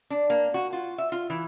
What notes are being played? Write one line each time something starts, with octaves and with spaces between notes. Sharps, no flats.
D4
A#3
F#4
F4
E5
F4
E3